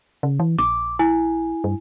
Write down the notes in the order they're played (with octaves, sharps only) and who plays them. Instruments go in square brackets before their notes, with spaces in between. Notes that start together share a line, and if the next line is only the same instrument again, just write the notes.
[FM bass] C#3
E3
[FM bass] A#1 [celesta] D6
[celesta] E4 G#5
[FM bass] G2